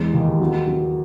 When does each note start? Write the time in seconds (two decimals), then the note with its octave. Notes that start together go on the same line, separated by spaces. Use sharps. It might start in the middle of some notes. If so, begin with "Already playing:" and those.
Already playing: E2 G#3
0.14 D#2
0.40 F#3
0.67 F#3